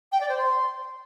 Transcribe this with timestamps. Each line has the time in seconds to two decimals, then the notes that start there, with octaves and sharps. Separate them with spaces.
0.12 G5
0.21 D5
0.29 C5
0.38 C6